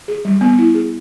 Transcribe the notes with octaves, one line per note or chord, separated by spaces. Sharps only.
G#4
G3
B3
E4
G#4